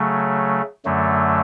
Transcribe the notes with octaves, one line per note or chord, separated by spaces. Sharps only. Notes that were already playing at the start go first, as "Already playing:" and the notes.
Already playing: C#3 F#3 A3
F#2 D3 F#3 A3